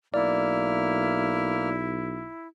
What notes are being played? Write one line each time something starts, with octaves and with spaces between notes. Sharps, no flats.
B1 A#3 E4 D5 F6